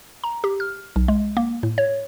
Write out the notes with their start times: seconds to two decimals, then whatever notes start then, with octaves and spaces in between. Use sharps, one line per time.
0.24 A#5
0.44 G4
0.60 F6
0.96 B1
1.08 G#3
1.37 A#3
1.63 A2
1.78 C#5